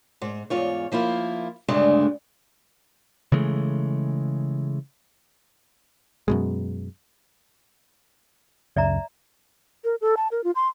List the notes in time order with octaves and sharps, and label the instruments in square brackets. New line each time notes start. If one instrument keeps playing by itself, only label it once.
[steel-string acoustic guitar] G#2
E2 G#2 F4 C#5
F3 A#3 E4 F4
D2 G2 C#3 G#3 A3 D4
[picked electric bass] C#3 E3 G#3 A3
F#2 B2 G#3
[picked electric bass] C#2 F#2 C#3 [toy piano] D5 E5 A#5
[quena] A#4
A4
A5
A#4
F4
C6